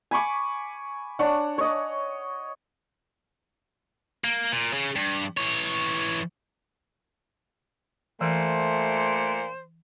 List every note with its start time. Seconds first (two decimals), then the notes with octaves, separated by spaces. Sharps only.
0.11 G#5 B5 C#6 D6
1.19 D4 C#5 F#5
1.58 C#5 D#5
4.24 A#3
4.53 A#2
4.74 C#3
4.96 G2
5.37 E3 C#5
8.21 A#2 E3 A3 C5